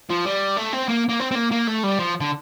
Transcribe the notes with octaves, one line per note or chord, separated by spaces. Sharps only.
F3
G3
A3
C4
A#3
A#3
C4
C4
A#3
A#3
A3
G3
F3
D3